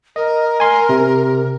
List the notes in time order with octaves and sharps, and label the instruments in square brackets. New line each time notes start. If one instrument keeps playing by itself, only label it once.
[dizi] A#4 [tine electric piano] D#5
[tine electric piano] G#5 C6
C3